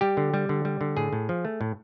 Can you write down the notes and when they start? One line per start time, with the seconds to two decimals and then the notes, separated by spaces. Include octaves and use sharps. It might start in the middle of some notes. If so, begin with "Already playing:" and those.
0.01 G3 G4
0.17 D3
0.34 G3
0.49 D3
0.65 G3
0.81 D3
0.97 A2 G#4
1.13 A2
1.29 F3
1.45 A3
1.61 A2